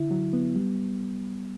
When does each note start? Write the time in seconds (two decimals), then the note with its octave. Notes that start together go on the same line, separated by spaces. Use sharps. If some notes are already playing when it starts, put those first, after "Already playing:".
Already playing: D3 E4
0.11 F#3
0.33 B3
0.56 G3